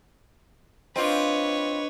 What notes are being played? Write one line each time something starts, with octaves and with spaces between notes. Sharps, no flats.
C4 D4 F4 B4 C#5 D#5